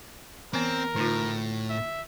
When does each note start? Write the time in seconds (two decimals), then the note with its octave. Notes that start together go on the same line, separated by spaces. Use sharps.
0.53 E3 B3 C4 A#4
0.96 A2 D3 D#4 F4
1.69 E5